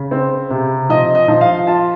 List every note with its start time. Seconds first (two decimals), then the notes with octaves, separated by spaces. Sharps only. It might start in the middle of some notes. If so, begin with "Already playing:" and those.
Already playing: C#3
0.11 C4
0.50 C3
0.89 F3 D#5
1.15 D#5
1.28 F3
1.41 F5
1.67 F4 A5